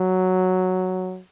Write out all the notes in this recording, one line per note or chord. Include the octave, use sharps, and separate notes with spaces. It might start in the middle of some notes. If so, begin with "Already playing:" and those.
Already playing: F#3